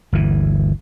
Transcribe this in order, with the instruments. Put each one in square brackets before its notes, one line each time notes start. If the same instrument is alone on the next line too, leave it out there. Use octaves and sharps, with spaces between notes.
[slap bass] G1 D2 E3